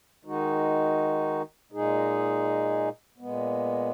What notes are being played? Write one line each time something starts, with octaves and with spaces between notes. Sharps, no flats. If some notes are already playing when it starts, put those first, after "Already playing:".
D#3 G#3 D#4 F#4
A#2 G#3 D#4 G#4
A#2 G#3 B3